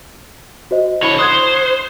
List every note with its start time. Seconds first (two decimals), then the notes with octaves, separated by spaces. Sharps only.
0.71 F#4 C5 D#5
1.03 D3 E4 C#5 B5 G7
1.19 C5 D#6 F#6 G#6